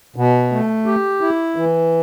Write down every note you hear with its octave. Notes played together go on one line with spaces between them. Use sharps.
B2
A3
G4
E4
E3